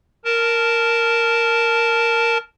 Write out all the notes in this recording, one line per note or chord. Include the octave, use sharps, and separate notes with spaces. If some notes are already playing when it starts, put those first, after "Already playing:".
A#4 A5